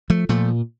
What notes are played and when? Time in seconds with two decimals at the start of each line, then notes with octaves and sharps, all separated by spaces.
0.10 F3 A3
0.29 A#2 F3 A3